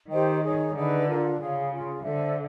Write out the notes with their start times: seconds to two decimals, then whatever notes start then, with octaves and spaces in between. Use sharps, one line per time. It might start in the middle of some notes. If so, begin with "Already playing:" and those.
0.09 D#3 G4 C5 D#5 G5
0.42 D#4 G#4 C#5
0.74 D3 D#4 G#4 B4 E5
1.06 D4 F4 A#4
1.38 C#3 F4 G#4 C#5 F5
1.71 C#4 F4 G#4
2.03 D3 A4 C5 E5